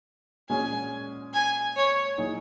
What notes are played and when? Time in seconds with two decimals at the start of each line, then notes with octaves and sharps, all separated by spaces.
0.49 A#2 G#3 C#4 F#4 G#5
1.33 G#5
1.76 C#5
2.18 A#2 F#3 D#4 G#4